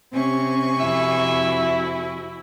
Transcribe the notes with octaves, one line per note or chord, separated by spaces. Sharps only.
C3 C4 C#4 G#5 C#6
F2 E4 F#4 E5